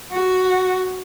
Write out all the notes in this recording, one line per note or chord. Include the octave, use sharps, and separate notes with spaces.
F#4